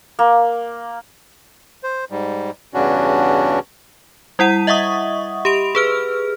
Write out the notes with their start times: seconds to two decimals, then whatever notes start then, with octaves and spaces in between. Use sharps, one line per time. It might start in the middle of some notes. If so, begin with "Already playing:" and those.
0.19 A#3
1.83 C5
2.11 G#2 G3
2.74 E2 G2 C#3 C#4 D4 F#4
4.39 G3 E4 F#5 D#7
4.67 D#5 E5 F#5 C#6 D#6
5.45 G4 B5 D7 F7
5.75 G#4 B4 F6